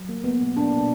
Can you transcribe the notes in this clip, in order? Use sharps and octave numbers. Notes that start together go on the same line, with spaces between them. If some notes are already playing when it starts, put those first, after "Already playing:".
Already playing: F#3
A#3
A#3 B3
B2
A#3 D4
B2